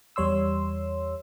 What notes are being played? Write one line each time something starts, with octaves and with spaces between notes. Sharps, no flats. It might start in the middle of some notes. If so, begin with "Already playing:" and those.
E2 G3 C#5 C6 E6